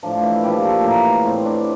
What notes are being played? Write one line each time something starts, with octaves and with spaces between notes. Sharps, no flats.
A2 F3 D4
F4
E3 E4
A#2 F3 G3 G4
A3 A4
A2 E3 A#3 A#4
A2 E3 C4 C5
D4 D5